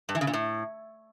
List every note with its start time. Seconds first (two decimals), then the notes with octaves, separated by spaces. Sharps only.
0.09 G2
0.15 E3
0.21 C#3
0.27 A#2
0.33 A2